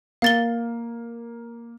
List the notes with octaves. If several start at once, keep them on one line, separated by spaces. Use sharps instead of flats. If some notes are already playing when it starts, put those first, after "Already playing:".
A#3 F5 A6 G7